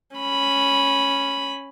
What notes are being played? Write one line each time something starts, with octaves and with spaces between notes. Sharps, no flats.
C#4 B5